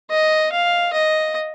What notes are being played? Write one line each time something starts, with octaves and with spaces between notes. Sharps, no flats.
D#5
F5
D#5